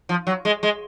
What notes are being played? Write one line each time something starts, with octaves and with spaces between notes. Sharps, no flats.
F3
F#3
G#3
G#3